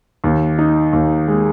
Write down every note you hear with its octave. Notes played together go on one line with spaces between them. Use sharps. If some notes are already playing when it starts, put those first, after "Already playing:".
D#2
D#4
D#2
G#3